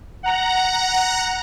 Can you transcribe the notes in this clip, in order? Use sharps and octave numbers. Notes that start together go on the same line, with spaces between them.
F#5 A#5